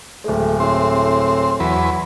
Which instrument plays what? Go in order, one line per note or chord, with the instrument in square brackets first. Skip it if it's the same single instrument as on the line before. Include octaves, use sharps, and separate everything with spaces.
[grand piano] D1 G#3 [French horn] A3
[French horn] A2 [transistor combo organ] C4
[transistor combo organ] E2 B4 [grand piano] F#3